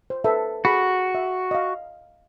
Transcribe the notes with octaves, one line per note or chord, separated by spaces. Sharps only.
C5
A4 B4 E5
F#4 G#4 B5
E5
D#5 F5